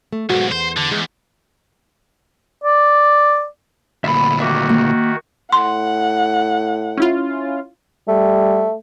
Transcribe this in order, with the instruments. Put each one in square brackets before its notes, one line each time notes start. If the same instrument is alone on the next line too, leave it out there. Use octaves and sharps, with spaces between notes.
[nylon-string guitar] A3
[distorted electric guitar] B1 G#2 [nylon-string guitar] F#4
[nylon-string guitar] E2 [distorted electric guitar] C5
[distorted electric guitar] D3
[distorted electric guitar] E2 [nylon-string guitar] G#3
[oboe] D5
[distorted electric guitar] D2 A#2 [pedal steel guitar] E5 B5
[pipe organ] D#3 F#4 [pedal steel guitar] E5 D6
[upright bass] A#3
[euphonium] A2 [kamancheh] F#5 [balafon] C6
[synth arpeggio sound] C#4 E4 F4
[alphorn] G3 [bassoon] A3